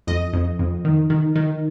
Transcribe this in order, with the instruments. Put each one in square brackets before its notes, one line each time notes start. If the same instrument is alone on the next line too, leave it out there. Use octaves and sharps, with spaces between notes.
[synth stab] F2 D#5
F2
F2
D#3
D#3
D#3